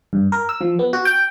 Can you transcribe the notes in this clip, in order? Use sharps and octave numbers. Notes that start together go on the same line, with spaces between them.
G2
A#4
E6
F3
B3
F#4
G5